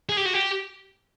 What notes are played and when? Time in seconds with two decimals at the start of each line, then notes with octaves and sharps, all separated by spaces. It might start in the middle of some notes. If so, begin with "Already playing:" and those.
0.09 G#4
0.17 G4
0.25 F#4
0.34 G4